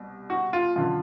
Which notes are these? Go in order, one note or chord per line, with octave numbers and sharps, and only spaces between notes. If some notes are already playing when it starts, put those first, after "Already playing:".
Already playing: C2 B2
F#4
F4
F#2 D3 F4